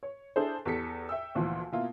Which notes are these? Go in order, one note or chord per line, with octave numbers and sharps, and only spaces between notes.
C#5
D4 E4 G#4 A4 C5
E2 G4 A4 B6 C#7
E5 G5 E6
D2 A#2 E3 F3
B2 A#3 E4 F4